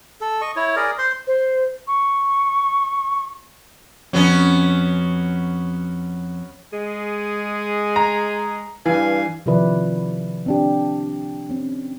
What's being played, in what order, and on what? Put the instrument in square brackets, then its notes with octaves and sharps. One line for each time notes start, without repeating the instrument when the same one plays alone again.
[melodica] A4
D#5 C#6
E4 C#5
G#4 A#4 D5
C5 C6
[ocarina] C5
C#6
[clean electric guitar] F2 [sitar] F#3 B3 C#4
[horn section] G#3 G#4
[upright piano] A#5
[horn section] G2 F5 G#5 [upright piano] E3
[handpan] C3 D#3 F3 E4 B4 D5
C4 D4 G4
C4 C#4